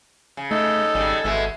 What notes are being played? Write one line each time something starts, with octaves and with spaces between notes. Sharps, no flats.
C#3
A3 D#4 A4
G#1 C#3 G3
G#1 B2 G#3 A3